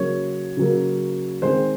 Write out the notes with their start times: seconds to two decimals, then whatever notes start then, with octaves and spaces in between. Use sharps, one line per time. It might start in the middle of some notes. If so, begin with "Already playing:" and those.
Already playing: C#3 F#3 A#3 C#5
0.57 C#3 F#3 A#3
1.42 D#3 G#3 C4 C5